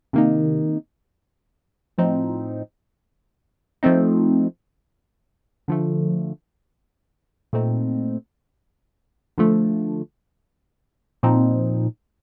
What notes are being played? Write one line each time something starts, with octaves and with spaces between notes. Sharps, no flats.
C3 D#3 A#3 D#4
A2 F3 C4 D#4
F3 A3 C4 D#4
D3 F3 A3
A#2 A3 C4 D#4
D3 F3 A3
A#2 F3 C4 D#4